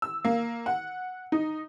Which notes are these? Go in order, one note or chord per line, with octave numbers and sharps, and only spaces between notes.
E6
A#3
F#5
D#4